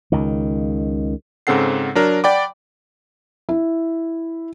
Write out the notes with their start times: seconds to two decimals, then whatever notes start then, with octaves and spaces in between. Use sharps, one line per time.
0.12 C#2 D#3
1.47 G#2 C#3 C4 A4 F#5 C7
1.95 F#3 D4 A#4
2.24 D5 F#5 G5 B5 D6
3.49 E4